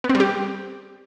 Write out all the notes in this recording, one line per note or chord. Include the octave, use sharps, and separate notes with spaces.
B3
C4
G3
G4